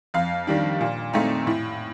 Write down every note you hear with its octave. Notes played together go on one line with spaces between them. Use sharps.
F2 F5
D#3 G3 D4
A#2
A3 C4 D#4
A2